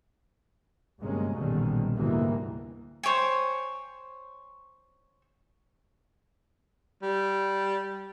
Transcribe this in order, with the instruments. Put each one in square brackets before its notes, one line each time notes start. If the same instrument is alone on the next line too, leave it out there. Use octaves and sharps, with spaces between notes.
[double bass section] G1 F#2 C3 G#3 A#3 C#4
A#1 F#2 B2 D3 D#3 G3
D2 G#2 C3 E3 G3 A#3
[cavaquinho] C5 C#5 G5 G#5
[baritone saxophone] G3